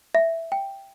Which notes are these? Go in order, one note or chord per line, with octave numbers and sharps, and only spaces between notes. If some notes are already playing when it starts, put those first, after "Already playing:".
E5
G5